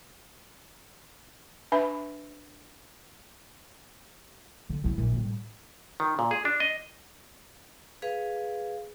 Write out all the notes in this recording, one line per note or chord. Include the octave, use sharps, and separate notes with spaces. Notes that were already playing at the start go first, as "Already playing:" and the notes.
D4 B4 E5 B5
D3
C#3 E4
A#1 A#3
A2 G3
D#3
A#2
G#4
D4
D#5
G#4 B4 F5